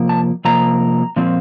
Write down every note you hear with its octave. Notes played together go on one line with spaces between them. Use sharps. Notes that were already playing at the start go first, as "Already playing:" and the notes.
Already playing: C3 F3 A#3
A5
C3 F3 A#3 A#5
A#2 F3 C4